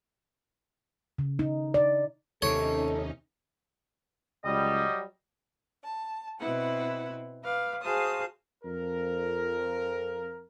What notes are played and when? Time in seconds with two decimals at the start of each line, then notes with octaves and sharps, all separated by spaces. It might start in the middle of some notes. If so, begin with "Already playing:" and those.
1.18 C#3
1.39 D#4
1.74 D5
2.42 D#2 C3 C#4 D#4 A4 C#5
4.45 C#2 F#3 G3 D#5
5.83 A5
6.39 B2 C4 E4 B4 F#5
7.42 B4 F5 D6
7.81 F#4 G#4 C5 F5 A5 D#6
8.64 F2 A#4